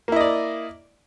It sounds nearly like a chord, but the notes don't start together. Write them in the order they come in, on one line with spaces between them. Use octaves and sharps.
A#3 E4 D#5 D5